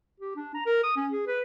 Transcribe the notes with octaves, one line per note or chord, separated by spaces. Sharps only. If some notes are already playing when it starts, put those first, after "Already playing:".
G4
D4
A#5
A#4
D#6
C#4
G#4
B4